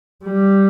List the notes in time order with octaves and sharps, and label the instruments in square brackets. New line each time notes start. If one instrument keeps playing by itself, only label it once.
[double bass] G3